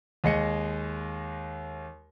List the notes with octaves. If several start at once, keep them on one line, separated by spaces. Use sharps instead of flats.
D#2 G#3 D#5 C#7